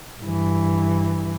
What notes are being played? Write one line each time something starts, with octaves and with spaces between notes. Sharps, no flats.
G2 E3